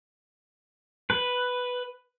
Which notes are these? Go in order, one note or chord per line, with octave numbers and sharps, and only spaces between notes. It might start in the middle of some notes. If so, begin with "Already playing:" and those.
B4